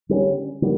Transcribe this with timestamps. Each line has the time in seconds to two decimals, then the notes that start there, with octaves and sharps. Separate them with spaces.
0.09 D3 G3 A#3 C#4
0.62 D3 G3 A#3